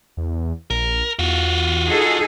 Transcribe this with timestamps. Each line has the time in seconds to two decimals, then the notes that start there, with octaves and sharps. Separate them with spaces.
0.17 E2
0.70 A#1 A#4
1.19 E2 F4 F#4
1.87 D#4 G#4 A4